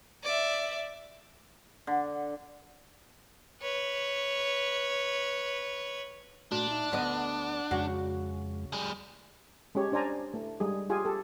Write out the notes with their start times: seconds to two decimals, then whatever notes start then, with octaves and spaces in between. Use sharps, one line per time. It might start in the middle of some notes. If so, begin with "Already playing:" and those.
0.24 D5 E5
1.87 D3
3.61 B4 C#5
6.52 A#2 A3 D4 F#4
6.71 D#4 E5
6.92 D2 B3 D#5 F#5
7.71 F2 C#3 G#3 F#4
8.73 G3 G#4
9.75 G#3 C#4 G4 C#5
9.92 D4 C5 D5 G#5 A#5
10.34 A3
10.60 G3 G#3 G#4
10.90 F4 G4 G#4 F5 G#5
11.05 G4 A4